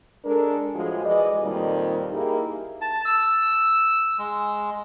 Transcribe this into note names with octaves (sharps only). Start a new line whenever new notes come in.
G#3 D4 A4 A#4
A2 F3 G#3 F#4 G#4
E3 G#3 D5 D#5
F2 A#2 D#3 G3 A#3 D#4
A#3 D#4 E4 G4 G#4 A#4
A5
E6
G#3